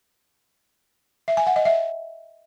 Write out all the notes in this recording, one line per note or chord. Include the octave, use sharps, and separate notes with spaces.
E5
G#5
F#5
D#5
E5